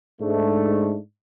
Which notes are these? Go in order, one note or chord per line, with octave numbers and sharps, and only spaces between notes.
G#2 A3 D4